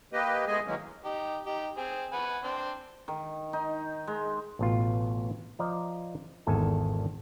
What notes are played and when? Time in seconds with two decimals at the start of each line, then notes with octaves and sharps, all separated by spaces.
0.13 A#3 G4 B4 D#5
0.47 G#3 A3 B3 G#4 D#5 G#5
0.66 D#3 E3 F#3 G#3 A#3 C#4
1.05 D#4 G4
1.46 D#4 G4
1.77 C4 G#4
2.13 B4 F#5 G#5
2.43 C4 D4 C6
3.08 D#3
3.53 D#4
4.07 G#3
4.59 A1 B2 F4
5.59 F3 D5 D#5 A#5
6.47 G#1 E2 D#3 A4 G#5